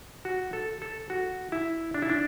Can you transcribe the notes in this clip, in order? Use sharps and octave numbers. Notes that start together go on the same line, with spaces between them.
F#4
A4
A4
F#4
E4
D4
E4
D4